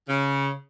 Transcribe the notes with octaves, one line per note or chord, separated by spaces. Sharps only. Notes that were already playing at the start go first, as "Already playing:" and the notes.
C#3